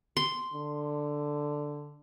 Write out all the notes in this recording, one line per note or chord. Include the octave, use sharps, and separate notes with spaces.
C6
D3